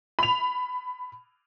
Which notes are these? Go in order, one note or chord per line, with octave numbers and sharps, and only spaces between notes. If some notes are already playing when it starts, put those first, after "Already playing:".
B5 F7